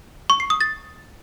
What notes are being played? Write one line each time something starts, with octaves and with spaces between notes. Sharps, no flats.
C#6
C7
D#6
A6